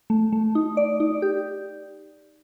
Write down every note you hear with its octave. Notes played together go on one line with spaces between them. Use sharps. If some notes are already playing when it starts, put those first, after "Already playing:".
A3
A3
D#4
D5
D#4
G4